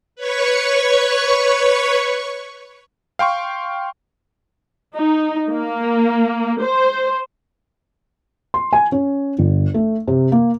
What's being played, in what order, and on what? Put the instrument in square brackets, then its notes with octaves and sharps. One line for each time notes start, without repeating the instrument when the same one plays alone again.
[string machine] B4 C#5 C#6
[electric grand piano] F5 G5 C6 C#6
[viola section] D#4
A#3
C5
[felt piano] C6
G#5
C#4
G1
A3
C3
A#3